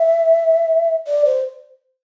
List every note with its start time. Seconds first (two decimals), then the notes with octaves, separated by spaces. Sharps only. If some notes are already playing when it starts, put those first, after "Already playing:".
Already playing: E5
1.07 D5
1.25 C5